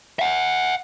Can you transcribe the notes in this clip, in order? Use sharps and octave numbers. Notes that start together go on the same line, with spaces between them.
E5 F#5